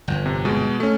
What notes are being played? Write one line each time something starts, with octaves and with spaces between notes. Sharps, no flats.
G1 F2
C3
B2 G#3
A3 C#4